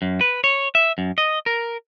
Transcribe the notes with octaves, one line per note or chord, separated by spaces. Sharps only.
F#2
B4
C#5
E5
F#2
D#5
A#4